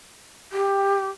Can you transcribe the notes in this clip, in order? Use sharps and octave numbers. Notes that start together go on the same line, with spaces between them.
G4